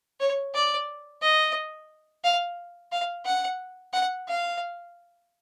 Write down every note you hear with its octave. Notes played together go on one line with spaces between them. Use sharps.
C#5
D5
D#5
F5
F5
F#5
F#5
F5